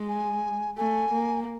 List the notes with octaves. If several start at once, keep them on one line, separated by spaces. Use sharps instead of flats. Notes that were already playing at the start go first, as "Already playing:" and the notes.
Already playing: G#3
G#5
A3 G#5
A#3